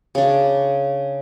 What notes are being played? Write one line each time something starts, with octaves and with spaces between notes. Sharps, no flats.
C#3 D4